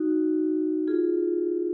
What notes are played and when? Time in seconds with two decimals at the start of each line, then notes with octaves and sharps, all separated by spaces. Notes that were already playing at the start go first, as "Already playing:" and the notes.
Already playing: D#4 F#4
0.88 F4 G#4